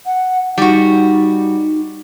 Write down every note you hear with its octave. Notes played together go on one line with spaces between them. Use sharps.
F#5
G3 D#4 F#4